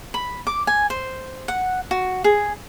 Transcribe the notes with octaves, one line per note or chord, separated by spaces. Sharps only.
B5
D6
G#5
C5
F#5
F#4
G#4